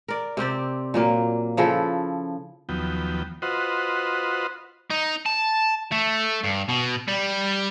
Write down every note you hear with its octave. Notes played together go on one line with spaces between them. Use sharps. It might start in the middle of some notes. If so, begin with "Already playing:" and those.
A#4 D5
C3 C4 G4 D5
A#2 F#3 A#3
C#3 F3 E4 A4
D#2 F3 F#3 B3 G5
F4 F#4 B4 C5 D#5 F#5
D#4
A5
A3
G2
B2
G3